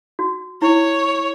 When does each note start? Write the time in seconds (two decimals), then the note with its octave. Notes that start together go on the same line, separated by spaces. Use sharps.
0.19 F#4
0.62 E4 C#5